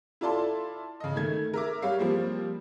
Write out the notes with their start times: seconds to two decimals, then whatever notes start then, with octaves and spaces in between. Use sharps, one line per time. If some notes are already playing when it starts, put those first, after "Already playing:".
0.21 E4 F4 A4 D5 A5 C6
1.00 C#3 D#5
1.15 D#3 A3 G#6
1.54 A#4 E5 D6
1.82 G3 C#5 F5
1.99 F3 G3 A#3 C4